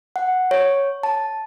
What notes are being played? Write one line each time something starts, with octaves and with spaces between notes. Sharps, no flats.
F#5
C#5
A5